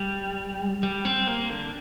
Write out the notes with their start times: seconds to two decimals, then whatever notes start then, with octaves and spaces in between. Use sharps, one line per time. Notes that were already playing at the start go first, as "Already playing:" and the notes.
Already playing: G3
0.83 G3
1.05 C4
1.27 A#3
1.50 D3